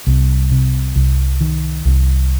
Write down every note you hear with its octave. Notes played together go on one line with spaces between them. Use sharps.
C2
C3
C2
D#3
C2